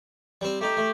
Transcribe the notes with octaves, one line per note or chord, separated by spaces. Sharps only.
G3 C4
A3 D#4 G4
A3